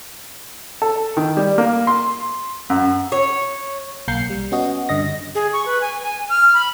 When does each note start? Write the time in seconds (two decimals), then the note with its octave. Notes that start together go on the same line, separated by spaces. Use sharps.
0.82 A4
1.17 D#3
1.37 G3
1.58 A#3
1.87 C6
2.70 F#2
3.12 C#5
4.08 B1 A#3 A#4 G6 C7 C#7
4.30 G3
4.52 B3 C#4 F#4 D#5
4.89 G2 D3 D#5 A#6
5.35 G#4
5.53 C#6
5.66 B4
5.81 G#5
6.03 G#5
6.29 F6
6.54 B5